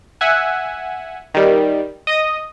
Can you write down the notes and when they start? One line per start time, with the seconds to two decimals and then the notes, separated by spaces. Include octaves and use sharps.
0.21 E5 F#5 G#5
1.34 D#3 G3
2.07 D#5 D#6